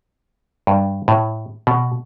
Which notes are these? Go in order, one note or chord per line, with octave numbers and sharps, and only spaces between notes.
G2
A2
B2